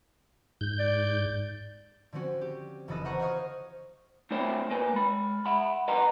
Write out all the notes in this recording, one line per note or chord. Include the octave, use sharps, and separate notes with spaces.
G#2 G6
D5
D3 F3 C4 C#4 F#4
G4
F1 C#3 E3 A4 D#5 F#6
C5 D#5 F#5 A#5 C#6
F#4 C5 C#5 D#5 F5 C#6
A3 C4 D4 E4 C5 C#5
A#2 A#3 B4 G#5
G#3 B5
E5 F#5 B5
B4 D#5 F#5 A#5 C6